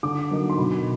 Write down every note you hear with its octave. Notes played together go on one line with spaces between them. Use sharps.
D3 D6
F#3 A#3 D#4
C6
B2 B5